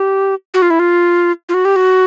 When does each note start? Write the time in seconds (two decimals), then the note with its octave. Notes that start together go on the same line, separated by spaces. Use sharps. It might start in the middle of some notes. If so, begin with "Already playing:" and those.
Already playing: G4
0.54 F#4
0.62 F4
0.70 E4
0.79 F4
1.49 F4
1.54 F#4
1.65 G4
1.76 F#4